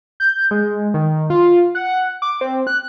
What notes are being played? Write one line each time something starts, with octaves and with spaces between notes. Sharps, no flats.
G6
G#3
D#3
F4
F#5
D6
C4
F#6